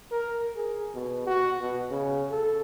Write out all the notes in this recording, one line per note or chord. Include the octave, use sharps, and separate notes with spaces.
A#4
G#4
B2
F#4
B2
C#3
A4